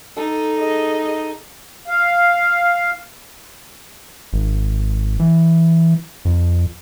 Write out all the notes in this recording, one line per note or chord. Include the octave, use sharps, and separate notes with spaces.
D#4 A4
G#4 D#5
F5
G#1
E3
F2